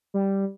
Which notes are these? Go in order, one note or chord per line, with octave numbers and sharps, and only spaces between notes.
G3